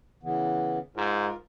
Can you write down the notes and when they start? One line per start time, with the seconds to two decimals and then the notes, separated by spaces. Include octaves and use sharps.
0.23 C#3 E3 B3
0.96 G#2 F4 A#4